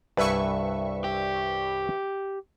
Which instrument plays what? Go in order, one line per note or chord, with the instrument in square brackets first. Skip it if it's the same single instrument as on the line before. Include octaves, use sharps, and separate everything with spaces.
[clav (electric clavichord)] C2 G2 G#5 [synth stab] B4 E5 C#6
[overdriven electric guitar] G4